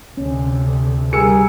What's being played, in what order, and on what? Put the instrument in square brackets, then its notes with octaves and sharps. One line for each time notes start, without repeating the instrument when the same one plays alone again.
[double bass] D2 C3 [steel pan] C#4
[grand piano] G3 E6 C#7 [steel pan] G#4 A#4 [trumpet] G#5